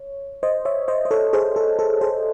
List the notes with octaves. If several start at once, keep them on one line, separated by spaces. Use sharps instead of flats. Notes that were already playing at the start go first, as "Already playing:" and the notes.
Already playing: C#5
C5 D#5
C#5 E5
C5 D#5
C5
A4 C#5
G#4 C5
A4
A4
G#4 C5